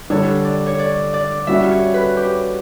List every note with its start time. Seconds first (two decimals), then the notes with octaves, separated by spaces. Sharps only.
0.10 D3 G3 D4 A4 C#5
0.45 D5
0.66 C#5
0.79 D5
1.14 D5
1.47 G3 C#4 F#4 E5
1.71 C#5
1.94 B4
2.17 G4